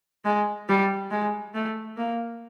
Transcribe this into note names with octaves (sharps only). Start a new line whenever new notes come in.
G#3
G3
G#3
A3
A#3